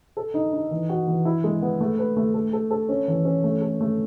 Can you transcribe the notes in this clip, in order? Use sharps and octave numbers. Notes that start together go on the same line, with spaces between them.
A4
D#4
D#4
E3
F#4
E3
E4
G#3
B3
A3
B4
A3
A4
A4
A4
C#4
E3
C#4
A3
A4
A3